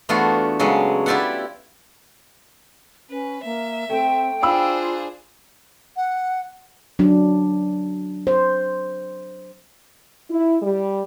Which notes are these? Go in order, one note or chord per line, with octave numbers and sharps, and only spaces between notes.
E2 A3 B3 D4 F4 F#4
C#3 F#3 G#3 A4 B4 D5
E4 F4 G4 D5 E5 F#5
C#4 B4
A#3 E5
A3 C4 G5
D4 F4 G#4 C5 F5 B5 E6
F#5
F#3 D4
C5
E4
G3